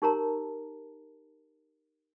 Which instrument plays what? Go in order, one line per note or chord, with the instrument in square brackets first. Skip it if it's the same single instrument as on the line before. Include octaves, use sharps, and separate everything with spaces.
[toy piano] D#4 G4 A#4 C#5 A5 A#5